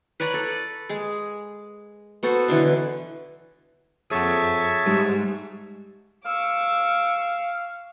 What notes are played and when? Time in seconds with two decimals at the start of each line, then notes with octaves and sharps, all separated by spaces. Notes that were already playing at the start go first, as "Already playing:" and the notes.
0.20 B4 C#5 D5 A#5
0.34 A4 B4 D5
0.89 G#3 G#4
2.23 B3 F#4 A4 C5
2.48 B2 D3 E3 F#3
4.11 F2 G#4 C#5 E5 F#5 A5
4.86 G3 G#3 D#4 G#4
6.25 F5 C#6 D6 E6